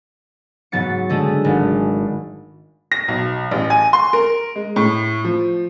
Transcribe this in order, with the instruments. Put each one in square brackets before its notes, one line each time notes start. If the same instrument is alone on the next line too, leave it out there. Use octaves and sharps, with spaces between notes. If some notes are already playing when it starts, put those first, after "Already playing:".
[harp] G#2 F#3 B3 A6 C#7
D3 G#3 A3 G#4 A4
G#1
[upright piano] A#6
B1
A1
G#5
C6
A#4
G#3
A2
F3